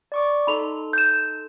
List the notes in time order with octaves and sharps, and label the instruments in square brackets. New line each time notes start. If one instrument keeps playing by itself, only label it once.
[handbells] D5 C#6 D6
[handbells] D#4 A4 C6 [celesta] B5 F7
[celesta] G6 E7